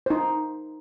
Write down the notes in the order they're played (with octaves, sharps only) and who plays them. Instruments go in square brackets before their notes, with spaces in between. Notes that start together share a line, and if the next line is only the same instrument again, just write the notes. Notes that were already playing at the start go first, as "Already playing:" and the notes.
[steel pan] D#4 C5